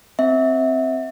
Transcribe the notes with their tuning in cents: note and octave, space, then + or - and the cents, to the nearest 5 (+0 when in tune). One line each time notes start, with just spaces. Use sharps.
C4 +0 E5 -25